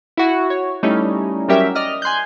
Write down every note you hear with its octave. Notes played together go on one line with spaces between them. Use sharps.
E4 F#4
C#5
G3 A3 C#4 D#4 E4
F#3 G3 C#4 G4 A#4 E5
D5 D#5 F6
G#5 C6 F#6 G6